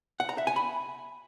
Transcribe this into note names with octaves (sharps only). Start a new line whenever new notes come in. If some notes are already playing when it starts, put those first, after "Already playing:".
F#5
A#5
E5
G#5
B5